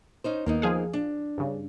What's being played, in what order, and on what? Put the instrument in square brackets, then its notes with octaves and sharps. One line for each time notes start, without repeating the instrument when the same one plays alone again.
[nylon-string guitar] C#4 D#4 C5
[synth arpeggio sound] D#2 [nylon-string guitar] A#3 B3 D#4
[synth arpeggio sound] F3 G#4 F5
[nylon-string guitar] D4
[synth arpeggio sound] G2 C#3